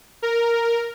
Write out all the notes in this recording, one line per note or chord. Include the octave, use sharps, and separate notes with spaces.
A#4